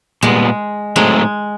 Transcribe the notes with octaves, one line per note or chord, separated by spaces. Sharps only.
A#2 G3 G#3 B3
A2 F#3 G#3 A3 C4 D#4